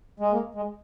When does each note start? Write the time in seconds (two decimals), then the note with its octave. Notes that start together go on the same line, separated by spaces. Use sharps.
0.20 G#3
0.31 A#3
0.55 G#3